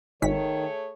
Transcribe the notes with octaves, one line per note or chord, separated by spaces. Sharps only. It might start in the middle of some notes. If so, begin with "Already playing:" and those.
G#1 G#2 D#3 A3 G#4 C#5 B6